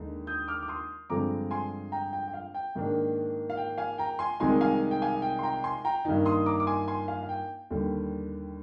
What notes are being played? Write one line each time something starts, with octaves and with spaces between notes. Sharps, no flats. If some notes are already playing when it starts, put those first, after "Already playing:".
Already playing: D#2 D3 G#3 D#4
D#6 G6
D6 F6
D6
C6 D#6
G2 D3 F3 G#3 C4 A#5 D6
G#5 C6
G5 A#5
G5
G5
F5
G5
G#2 D#3 A#3 D4
F5
G5
F5 G#5
G5 A#5
G#5 C6
C2 C3 D#3 G#3 D#4 G#5 C6
F5 G#5
G5
F5 G#5
G5
C6
G5 A#5
G#5 C6
G5 A#5
G2 D#3 A#3 D#4
C6 D#6
A#5 D6
D6
G#5 C6
G#5 C6
F5 G#5
F5
G5
D#2 D3 G3 D4